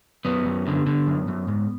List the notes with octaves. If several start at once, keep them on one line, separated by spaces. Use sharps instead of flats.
F#2 B3
F#2
D3
D3
F#2
F#2
G#2